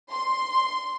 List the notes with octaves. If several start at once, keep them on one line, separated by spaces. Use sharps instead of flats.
C6